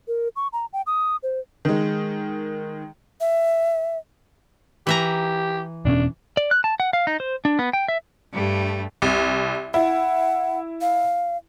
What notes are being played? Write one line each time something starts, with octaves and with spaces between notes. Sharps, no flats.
A#4
C#6
A#5
G5
D#6
C5
D#3 G#3
E5
E3 G4 E5 A#5
E1 B2 C#4 D4
D5
F#6
A5
F#5
F5
D#4
C5
D4
B3
G5
E5
G2 G3 A3
C2
E4 F#5
F5